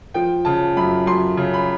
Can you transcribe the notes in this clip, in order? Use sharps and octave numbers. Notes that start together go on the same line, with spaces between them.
F3 G5
C#3 A5
F#2 B5
F#2 C6
C#3
B5